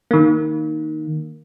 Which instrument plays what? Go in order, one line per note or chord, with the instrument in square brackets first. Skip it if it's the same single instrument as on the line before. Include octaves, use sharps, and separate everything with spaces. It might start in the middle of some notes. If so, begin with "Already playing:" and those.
[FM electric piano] D#3 A#3